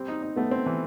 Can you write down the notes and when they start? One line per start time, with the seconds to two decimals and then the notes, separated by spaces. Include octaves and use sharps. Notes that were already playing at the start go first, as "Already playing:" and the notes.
Already playing: G3 C4
0.08 D#4
0.22 D#4
0.36 A3 B3
0.51 C4
0.66 E3